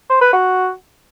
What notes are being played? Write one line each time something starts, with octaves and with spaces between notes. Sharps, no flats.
C5
B4
F#4